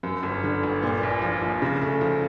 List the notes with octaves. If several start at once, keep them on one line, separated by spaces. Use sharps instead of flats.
F#2
G1
D3
G1
A#2
A#1
F3
A#1
C#3
A3
F3